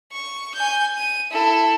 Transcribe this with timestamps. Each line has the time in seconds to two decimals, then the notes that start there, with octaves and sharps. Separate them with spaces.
0.12 C#6
0.55 G#5 G6
0.98 D#7
1.31 E4 A4